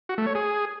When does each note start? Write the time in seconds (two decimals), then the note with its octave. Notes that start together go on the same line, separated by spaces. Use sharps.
0.09 F#4
0.18 A3
0.26 C#5
0.35 G#4